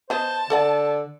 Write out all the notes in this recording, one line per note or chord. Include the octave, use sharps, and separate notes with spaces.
B3 C5 D#5 A5
D3 A4 D5 F#5